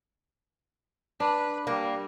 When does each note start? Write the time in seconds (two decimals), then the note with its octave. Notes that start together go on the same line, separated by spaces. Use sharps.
1.20 D4 B4
1.67 G3 A#3